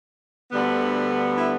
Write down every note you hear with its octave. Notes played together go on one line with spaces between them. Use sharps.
D2 D3 G3 B3
E4 E5